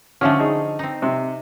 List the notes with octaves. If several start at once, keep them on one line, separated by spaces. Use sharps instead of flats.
D3 F3 A3 C#4 F6
D#4 G#4
C4 D#4
C3